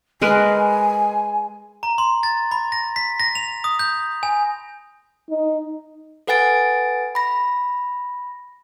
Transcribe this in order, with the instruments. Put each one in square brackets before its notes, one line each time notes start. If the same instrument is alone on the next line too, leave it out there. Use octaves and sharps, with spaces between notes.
[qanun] G#3 A#4 B4 [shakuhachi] G#5
[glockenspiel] A#5
C6
A6
B5
A#6
B6
A#6
F7
D#6
G6
G#5
[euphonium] D#4
[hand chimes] A4 B4 F#5 G#5 A6 D7
B5 A#6